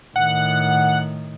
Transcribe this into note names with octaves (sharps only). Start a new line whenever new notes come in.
A2 D#3 F#5